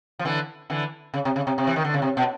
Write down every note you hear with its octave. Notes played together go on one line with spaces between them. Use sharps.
F3
D3 E3
D3 E3
C#3
C3
C#3
C3
C3
E3
D#3
D3
C#3
C3
B2